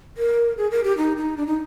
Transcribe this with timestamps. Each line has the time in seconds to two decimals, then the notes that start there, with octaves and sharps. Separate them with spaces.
0.17 A#4
0.57 G#4
0.71 A#4
0.84 G4
0.97 D#4
1.17 D#4
1.37 D4
1.47 D#4